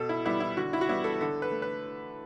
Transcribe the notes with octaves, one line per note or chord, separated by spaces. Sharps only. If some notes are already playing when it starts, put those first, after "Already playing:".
Already playing: B2 A4
E4
G3 B3 E4
E4
D3 F#4
E4
F#4
G3 B3 E4
A4
D3 A4
B4
A3
B4